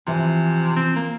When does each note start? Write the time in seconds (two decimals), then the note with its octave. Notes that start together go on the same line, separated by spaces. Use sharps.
0.07 C3 E3 F3
0.76 C4
0.96 A#3